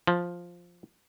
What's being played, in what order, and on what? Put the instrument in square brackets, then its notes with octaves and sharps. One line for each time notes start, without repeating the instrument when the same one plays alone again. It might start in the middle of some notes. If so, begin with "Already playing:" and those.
[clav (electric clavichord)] F3